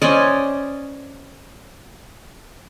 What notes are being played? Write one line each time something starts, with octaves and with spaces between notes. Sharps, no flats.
C#4 C5 D5 D#5